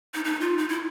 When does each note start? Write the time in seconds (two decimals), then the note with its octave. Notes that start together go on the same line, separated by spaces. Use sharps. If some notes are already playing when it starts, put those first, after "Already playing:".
0.14 D#4
0.25 D#4
0.41 F4
0.58 D#4
0.69 E4